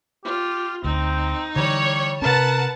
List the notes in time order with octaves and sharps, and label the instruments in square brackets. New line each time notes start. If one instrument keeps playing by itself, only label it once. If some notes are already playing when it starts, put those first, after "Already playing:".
[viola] F4 [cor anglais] G4
[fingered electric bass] D2 [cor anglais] C4 [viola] D#4
[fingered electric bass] D3 E3 [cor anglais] G3 [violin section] C#5
[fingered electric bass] C3 C#4 [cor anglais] A#4 [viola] B4 F#5 [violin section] A5